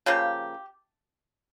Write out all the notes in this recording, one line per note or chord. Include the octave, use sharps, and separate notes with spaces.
C#3 F3 A#3 G4